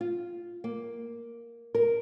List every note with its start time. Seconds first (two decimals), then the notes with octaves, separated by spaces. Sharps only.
0.01 F4
0.64 A#3
1.75 A#4